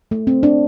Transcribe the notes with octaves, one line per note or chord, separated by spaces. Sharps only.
A3
C4
D4